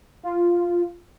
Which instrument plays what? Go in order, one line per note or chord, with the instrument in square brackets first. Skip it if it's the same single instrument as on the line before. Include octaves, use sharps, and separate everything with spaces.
[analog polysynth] F4